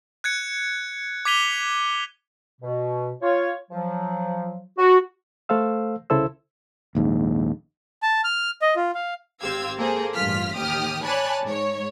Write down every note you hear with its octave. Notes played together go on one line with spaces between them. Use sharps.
F#6 G#6 C#7
D6 G#6 B6 D#7 F7 G7
B2
F4 C#5
F3 F#3
F#4
A3 A4 C5 F5 E6
C2 C#3 E4 A4 C5 E6
A#1 D#2 G#2
A5
F6
D#5
F4
F5
G#1 C4 G4 F5 E6 G#6
A#3 G#4 A4 C5
A1 G2 F4 F6 B6
D#2 G4 D#6 F6
C#5 D5 G#5 A5 B5 F#6
G#2 C#5